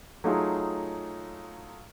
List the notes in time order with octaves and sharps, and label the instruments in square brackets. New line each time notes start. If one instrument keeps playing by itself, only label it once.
[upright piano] F#3 A3 D#4 F4 G#4